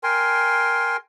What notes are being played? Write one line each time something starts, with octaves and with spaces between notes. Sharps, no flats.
A#4 G5 G#5 C6